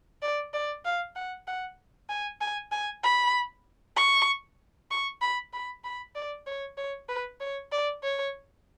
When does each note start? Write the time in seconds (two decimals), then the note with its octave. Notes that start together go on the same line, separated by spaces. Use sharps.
0.22 D5
0.54 D5
0.85 F5
1.16 F#5
1.47 F#5
2.09 G#5
2.41 G#5
2.72 G#5
3.03 B5
3.97 C#6
4.91 C#6
5.22 B5
5.53 B5
5.84 B5
6.15 D5
6.47 C#5
6.78 C#5
7.09 B4
7.41 C#5
7.72 D5
8.03 C#5